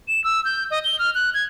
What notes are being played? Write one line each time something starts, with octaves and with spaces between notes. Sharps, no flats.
E7
E6
G6
D#5
G7
F6
F#6
G#6